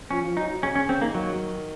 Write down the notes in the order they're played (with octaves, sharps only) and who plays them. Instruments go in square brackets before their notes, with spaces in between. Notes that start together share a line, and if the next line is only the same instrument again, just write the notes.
[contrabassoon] F3 [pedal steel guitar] C#4
[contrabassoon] F3
[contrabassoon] F#3 [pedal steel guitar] D#4
[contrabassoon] C#3 [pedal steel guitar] C#4
[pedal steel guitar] C#4
[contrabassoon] C#3 [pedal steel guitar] C4
[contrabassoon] D#3 [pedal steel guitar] A#3
[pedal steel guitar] F#3